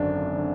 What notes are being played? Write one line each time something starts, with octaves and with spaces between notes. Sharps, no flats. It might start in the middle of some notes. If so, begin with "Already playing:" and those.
Already playing: G#1 F#2 D3 D4
D3